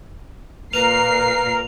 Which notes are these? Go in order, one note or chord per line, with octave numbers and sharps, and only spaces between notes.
A#2 A#4 B4 C7 F7